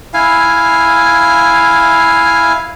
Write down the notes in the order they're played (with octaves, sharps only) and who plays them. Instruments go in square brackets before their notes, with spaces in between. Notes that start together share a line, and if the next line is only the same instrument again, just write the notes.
[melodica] E4 F5 G#5